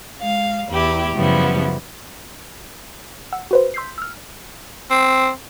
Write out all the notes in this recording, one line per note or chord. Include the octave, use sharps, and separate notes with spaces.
G#3 F5
E2 E4 G4
F#2 C#3 F3 G3 B3 E4
F#5 E6
F#4 B4 C5
C6 E6 G6 B6 C7
E6 F6
C4